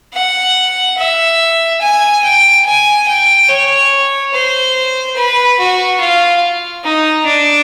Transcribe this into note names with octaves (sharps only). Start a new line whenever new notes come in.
F#5
E5
G#5
G5
G#5
G5
C#5
C5
B4
F#4
F4
D#4
D4